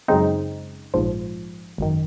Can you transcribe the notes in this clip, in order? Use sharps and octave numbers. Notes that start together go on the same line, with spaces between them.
F#2 C#3 G#3 C4 D#4
A#1 G#2 F3
G#1 F#2 D#3